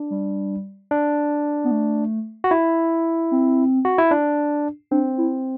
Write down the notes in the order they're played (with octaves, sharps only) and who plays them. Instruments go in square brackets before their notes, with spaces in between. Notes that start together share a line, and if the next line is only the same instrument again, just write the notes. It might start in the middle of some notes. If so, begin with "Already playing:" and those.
Already playing: [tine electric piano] D4
[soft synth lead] G3
[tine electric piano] D4
[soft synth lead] B3
A3
[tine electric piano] F#4
E4
[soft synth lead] C4
[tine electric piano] F#4
E4
D4
[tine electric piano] C4 [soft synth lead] D4
[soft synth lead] E4